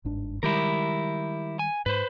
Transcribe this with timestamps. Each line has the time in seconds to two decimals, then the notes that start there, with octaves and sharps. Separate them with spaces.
0.05 G1 G#2 D4
0.43 D#3 G3 G#3 E4 G4 A#4
1.59 G#5
1.86 G#2 B4 C5